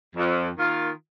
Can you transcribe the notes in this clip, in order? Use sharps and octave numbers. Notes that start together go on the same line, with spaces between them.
F2
D#3 A#3 F4